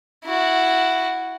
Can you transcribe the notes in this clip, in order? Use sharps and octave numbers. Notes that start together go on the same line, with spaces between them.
E4 F#4